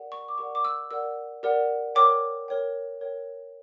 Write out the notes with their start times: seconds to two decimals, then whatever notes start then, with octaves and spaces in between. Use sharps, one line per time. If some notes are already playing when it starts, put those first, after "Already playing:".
Already playing: G4 A#4 D5 F#5
0.12 C#6
0.28 D6
0.38 G4 A#4 D5 F#5 C#6
0.55 D6
0.65 E6
0.91 G4 A#4 D5 F#5 E6
1.43 G4 A#4 D5 F#5
1.95 A#4 C#5 G5 D6
2.48 A#4 C#5 G5
3.01 A#4 C#5 G5